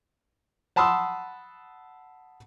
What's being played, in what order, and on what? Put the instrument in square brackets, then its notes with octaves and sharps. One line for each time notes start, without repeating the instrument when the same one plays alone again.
[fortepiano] F#5 A5 B5 C6 D#6 E6